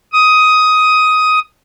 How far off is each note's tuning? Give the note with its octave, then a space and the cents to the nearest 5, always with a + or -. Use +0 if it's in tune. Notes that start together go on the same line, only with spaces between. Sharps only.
D#6 +10